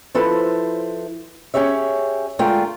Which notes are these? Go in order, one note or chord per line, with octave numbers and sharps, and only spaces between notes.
F3 E4 A4 B4 C5
C#4 G4 G#4 C#5 E5
D3 G#3 A3 F4 A#4 G5